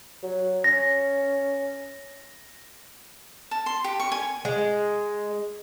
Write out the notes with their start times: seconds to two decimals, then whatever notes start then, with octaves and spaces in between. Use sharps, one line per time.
0.22 F#3
0.64 C#4 A#6
3.51 A5
3.66 C6
3.84 G4
4.00 C#6
4.12 G#5
4.45 G#3